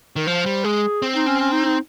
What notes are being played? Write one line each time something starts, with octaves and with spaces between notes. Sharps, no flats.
D#3 A#4
F3 C5
G3
G#3 G#4
C4
D#4
C#4
C#4
D#4
D#4